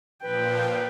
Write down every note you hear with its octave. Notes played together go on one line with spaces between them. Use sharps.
A#2 F3 B4 G5